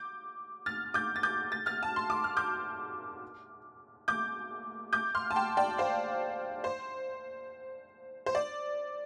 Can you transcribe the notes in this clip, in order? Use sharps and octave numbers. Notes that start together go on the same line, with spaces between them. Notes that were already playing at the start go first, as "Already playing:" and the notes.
Already playing: D6 G6
F6 A6
D6 G6
A6
D6 G6
A6
F6 A6
A5
C6
D6
F6
D6 G6
D6 G6
D6 G6
C6 F6
A5
G5 C6
D5 G5
C5 F5
C5
C5
D5